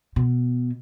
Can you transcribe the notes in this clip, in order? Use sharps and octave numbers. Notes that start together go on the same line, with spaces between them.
B2